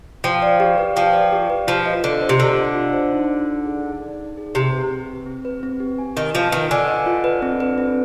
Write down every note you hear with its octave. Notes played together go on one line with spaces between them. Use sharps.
F3 G5
D5
G4
B4
F3 G5
D5
G4
B4
F3 F4
D#5
D3 F4
C5
C3
D3 F4
D#5
F4
C5
D#4
D5
D#4
G#4
D#4
D5
D#4
G#4
C3 C4
B4
C4
G4
C4
B4
C4
G4
G#5
D#3 D#5
F3 F4
D#3 B4
D3 G#5
D#5
F4
B4
C4
B4
C4